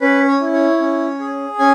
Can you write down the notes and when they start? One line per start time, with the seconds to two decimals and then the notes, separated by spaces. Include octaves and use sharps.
0.01 C#4 B4
0.27 C#5
0.40 E4
0.54 C#5
0.80 C#4
1.20 G#4
1.59 C#4 G#5